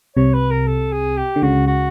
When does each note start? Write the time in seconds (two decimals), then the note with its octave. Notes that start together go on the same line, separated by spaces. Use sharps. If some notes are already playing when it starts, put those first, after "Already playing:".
0.16 C2 C3 C#5
0.34 B4
0.51 A#4
0.67 A4
0.92 G#4
1.17 G4
1.36 D3
1.42 C#2 C#3 F#4
1.67 F#4